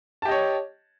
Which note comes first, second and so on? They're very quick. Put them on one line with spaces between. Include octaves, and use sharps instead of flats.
A5 G4 D#5 C#5